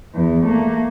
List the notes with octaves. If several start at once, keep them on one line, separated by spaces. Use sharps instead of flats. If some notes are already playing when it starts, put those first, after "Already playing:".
E2
A3 A#3